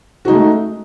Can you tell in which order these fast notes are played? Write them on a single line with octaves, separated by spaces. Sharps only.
F#4 D#4 G#3 A3